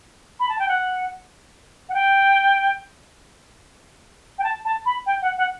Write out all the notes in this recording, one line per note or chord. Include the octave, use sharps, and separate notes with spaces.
B5
A5
G5
F#5
F#5
G5
G5
A5
A5
B5
G5
F#5
F#5